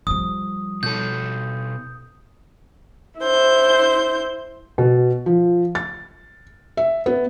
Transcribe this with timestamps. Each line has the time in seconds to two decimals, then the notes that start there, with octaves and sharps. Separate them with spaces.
0.07 F3 G3 D#6
0.83 B2 A4 G6
3.19 E4 C5 G6
4.78 B2
5.26 F3
5.75 A6
6.77 E5
7.06 B3